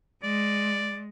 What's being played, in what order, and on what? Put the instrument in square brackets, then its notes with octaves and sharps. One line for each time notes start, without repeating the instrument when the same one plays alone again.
[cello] G#3 [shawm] D5